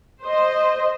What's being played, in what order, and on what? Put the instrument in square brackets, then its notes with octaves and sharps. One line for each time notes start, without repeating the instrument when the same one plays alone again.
[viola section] C5 D#5